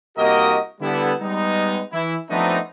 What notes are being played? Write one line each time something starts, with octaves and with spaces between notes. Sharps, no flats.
C2 A#3 F#4 G4 A#4 D#5
D3 G3 B3 E4
G3 G#3 B3 D#4
E3 E4
F3 A3 B3 C4 D4 D#4